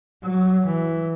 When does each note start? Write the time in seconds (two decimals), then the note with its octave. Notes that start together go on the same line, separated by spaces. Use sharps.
0.23 F#3
0.65 E3